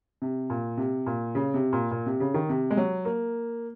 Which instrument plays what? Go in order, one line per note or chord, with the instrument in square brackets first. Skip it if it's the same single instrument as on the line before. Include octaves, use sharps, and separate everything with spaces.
[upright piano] C3
A#2
C3
A#2
C#3
C3
A#2
A#2
C3
C#3
D#3
C3
G#3
F#3
A#3